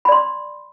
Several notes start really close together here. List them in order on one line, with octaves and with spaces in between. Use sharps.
B5 D5 C6